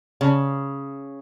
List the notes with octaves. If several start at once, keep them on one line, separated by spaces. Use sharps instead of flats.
C#3